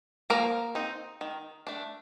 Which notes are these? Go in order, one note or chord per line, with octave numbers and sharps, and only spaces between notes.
F3 A#3 A#4
C4 D#4
D#3
A3 D4